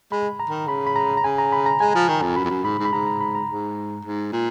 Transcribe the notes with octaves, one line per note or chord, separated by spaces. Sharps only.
G#3 B5
A#5
D#3
C#3 B5
B5
A#5
A#5
C#3 G#5
A#5
B5
A#5
G#3 G#5
F3
D#3
F2
F#2 B5
F2
F#2
G#2 B5
G#2
B5
G#2 A#5
A#5
B5
A#5
G#2
G#2
A#2